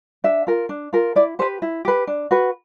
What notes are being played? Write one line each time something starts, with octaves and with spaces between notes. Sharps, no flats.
D4 E5
F4 A#4
D4
F4 A#4
E4 D5
G4 B4 C5
E4
G4 B4
D4
F#4 B4